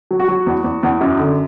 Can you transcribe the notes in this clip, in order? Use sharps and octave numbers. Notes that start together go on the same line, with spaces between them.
F#3
F#4
F#3
E2
E2
E2
F#2
D3